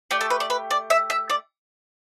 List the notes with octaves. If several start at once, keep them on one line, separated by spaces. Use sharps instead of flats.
A3 G4 D5
A4
B4
D5
B4
D5
E5
E5
D5